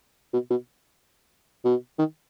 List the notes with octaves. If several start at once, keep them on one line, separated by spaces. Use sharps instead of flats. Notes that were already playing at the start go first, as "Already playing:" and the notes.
B2
B2
B2
D#3